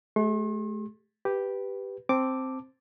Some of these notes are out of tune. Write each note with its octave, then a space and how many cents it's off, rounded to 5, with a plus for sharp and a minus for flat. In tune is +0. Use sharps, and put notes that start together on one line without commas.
A3 -40 G4 +15 C6 +45
G4 +0 B4 +0
C4 +0 A5 +0 D6 +0